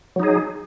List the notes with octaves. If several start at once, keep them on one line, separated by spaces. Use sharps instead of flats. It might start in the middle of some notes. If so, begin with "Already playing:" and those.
F#3 D#4 G#4